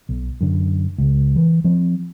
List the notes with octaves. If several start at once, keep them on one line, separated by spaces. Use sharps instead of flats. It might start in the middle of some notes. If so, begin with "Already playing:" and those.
B1
F#2 D3
C#2
E3
F3 C4